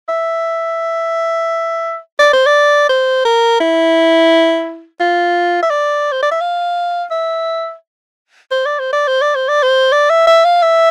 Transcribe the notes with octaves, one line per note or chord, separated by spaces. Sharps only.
E5
D5
C5
D5
C5
A#4
E4
F4
E5
D5
C5
D5
E5
F5
E5
C5
D5
C5
D5
C5
D5
C5
D5
C5
D5
E5
E5
F5
E5